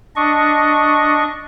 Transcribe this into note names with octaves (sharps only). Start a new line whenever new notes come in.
D4 D#5 C#6